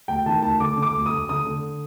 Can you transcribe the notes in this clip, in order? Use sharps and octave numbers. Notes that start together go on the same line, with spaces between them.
D2 G5
D#3 A5
D2 A5
D3 D6
D3
D6
D2
D#6
D2
D3 D#6
D3